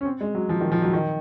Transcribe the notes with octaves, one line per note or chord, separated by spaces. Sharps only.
C#4
C4
G#3
F#3
F3
D#3
F3
F#3
D#3